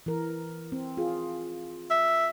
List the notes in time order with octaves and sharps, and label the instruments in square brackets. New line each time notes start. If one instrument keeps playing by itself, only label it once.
[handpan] E3 A#4
C4
F4 G#4
[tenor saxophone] E5